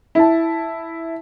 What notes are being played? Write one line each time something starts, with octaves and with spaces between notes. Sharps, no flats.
E4 A5